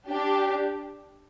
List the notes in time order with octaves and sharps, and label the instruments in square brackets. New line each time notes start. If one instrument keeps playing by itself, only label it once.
[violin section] D4 G4